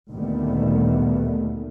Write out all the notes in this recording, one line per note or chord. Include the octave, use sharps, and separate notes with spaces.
D2 A#2 D#3 G3 A3 B3